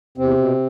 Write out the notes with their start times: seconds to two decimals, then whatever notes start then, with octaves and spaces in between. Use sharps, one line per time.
0.18 E2 C3 C4
0.38 B2